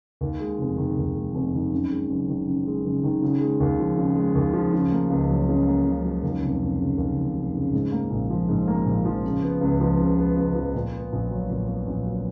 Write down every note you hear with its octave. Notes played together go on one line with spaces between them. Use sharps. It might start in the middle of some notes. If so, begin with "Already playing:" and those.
D#2
G#3
F1
D#3
D#2
G#3
F1
D#3
F#2
G#3
F#1
D#3
F#2
G#3
F#1
D#3
C#3
G#3
D#2
F3
C#3
G#3
D#2
F3
C#3
A#3
C#2
F#3
C#3
A#3
C#2
F#3
D#2
F1
F1
C#3
D#2
F1
F1
C#3
G#2
A#3
A#1
F3
G#2
A#3
A#1
F3
C#3
B3
C#2
F3
C#3
B3
C#2
F3
A#2
B3
A#1
F#3
A#2
B3
A#1
F#3